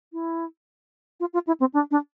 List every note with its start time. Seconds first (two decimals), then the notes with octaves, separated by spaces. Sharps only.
0.13 E4
1.20 F4
1.33 F4
1.47 E4
1.60 C4
1.73 D4
1.91 D4